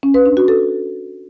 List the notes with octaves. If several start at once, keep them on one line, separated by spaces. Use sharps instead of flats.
C#4
B4
D4
F#4
A4